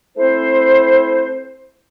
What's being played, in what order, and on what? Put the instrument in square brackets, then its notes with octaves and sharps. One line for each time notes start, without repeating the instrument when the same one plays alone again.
[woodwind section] A3 C4 E4 C5